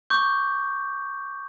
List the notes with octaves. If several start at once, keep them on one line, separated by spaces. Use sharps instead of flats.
C#6 D6 G6